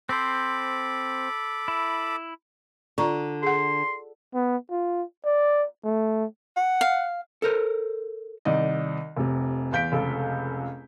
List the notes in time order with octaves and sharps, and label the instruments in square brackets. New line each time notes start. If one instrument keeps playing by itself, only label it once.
[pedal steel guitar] C4 C5 [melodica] A4 B5 D6
[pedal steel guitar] E4
[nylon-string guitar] D3 [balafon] F4 A#5 C#6
[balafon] G#4 F#5 [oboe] C6
[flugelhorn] B3
F4
D5
A3
[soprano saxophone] F#5
[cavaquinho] F5
[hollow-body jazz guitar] A4 A#4 C5
[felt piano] C2 D#3 D#4 D5 D#5
F1 C3
E2 F5 G6 B6 D7
F1 C#2 A4